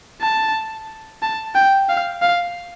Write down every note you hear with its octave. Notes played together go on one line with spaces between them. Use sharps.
A5
A5
G5
F5
F5